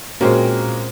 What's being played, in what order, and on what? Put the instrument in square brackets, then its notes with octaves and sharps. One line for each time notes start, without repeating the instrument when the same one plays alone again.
[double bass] A#2 [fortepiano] G#3 A#3 [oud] C4 C#4 [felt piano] F#4